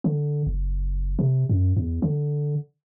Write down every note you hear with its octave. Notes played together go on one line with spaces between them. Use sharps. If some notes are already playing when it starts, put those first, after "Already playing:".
D3
F#1
C3
F#2
E2
D3